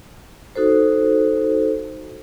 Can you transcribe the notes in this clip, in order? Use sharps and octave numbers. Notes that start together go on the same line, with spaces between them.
D#4 F#4 A4 C5